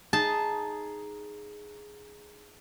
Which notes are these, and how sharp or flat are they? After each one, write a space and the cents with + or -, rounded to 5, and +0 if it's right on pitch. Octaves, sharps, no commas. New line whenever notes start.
D#4 +0 G#4 +5 A5 -10